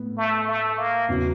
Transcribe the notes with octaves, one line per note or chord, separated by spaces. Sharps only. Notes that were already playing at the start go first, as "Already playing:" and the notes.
Already playing: A2 B3
A3
A3
A#3
E2 C#3 F#3